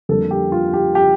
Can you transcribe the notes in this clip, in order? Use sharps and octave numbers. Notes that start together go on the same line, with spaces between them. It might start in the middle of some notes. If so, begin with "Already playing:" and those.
F2 D3 G3 A#3 A4
G4
F4
G4
G4